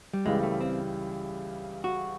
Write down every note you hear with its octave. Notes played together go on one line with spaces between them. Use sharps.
G3
C#2 C#3 E3 G3 G#3
A3
C4
F#4